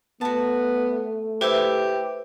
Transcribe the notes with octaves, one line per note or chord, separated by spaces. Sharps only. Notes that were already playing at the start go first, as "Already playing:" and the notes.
A3 B3 F#4 A5
E4 G4 B4 C5 E5